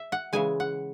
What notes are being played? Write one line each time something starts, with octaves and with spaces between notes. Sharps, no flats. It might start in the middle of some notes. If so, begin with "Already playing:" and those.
Already playing: E5
F#5
C#3 E3 G#3 G#5
F#5